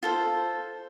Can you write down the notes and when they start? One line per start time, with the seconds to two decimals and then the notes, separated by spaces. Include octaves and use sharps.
0.03 F4 A4 C5